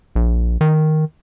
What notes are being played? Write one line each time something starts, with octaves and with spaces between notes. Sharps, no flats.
A#1
D#3